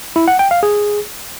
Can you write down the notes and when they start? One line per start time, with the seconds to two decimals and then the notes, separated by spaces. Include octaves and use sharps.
0.16 E4
0.28 F#5
0.39 G5
0.51 F5
0.63 G#4